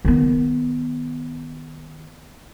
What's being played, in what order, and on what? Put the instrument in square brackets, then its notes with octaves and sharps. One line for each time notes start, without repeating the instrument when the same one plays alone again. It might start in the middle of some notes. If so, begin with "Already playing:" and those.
[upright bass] D#3 B3